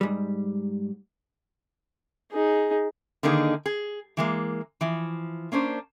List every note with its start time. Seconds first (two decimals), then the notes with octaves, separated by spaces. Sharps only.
0.01 G#2 G3
2.31 D#4 G#4
3.23 D3 D#3 A#3 D#4 G#4
3.66 G#4
4.17 E3 G#3 A#3
4.81 E3 F3
5.52 A#3 C#4 D4 C5